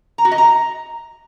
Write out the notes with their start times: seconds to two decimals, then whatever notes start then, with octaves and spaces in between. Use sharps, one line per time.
0.18 A#5
0.25 F#4
0.31 D#5
0.38 A#5